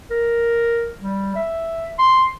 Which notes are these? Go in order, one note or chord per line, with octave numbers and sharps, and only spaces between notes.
A#4
G3
E5
C6